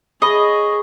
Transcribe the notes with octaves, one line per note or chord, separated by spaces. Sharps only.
G#4 C#5 D#5 B5